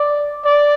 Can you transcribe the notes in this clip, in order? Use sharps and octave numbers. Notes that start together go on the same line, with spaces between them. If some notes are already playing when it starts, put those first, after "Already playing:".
Already playing: D5
D5